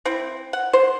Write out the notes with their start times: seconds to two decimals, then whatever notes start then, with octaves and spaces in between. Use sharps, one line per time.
0.05 C4 E4
0.53 F#5
0.73 C5